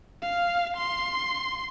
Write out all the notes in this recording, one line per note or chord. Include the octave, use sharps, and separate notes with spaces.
F5
C6